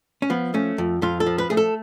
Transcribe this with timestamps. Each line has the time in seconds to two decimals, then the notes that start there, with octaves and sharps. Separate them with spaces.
0.22 C#4
0.30 F3 B3
0.54 A3 C#4
0.78 F2
1.02 F2 F4
1.20 A4
1.26 F3
1.38 B4
1.50 A3 G#4
1.57 A4